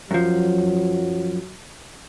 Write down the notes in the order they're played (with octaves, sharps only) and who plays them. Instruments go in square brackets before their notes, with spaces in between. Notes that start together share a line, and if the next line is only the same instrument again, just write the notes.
[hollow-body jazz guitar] F#2 F3 [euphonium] F#3